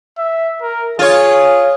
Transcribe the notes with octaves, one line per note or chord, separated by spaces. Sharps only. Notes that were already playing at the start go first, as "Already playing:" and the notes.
E5
A#4
F4 G#4 C#5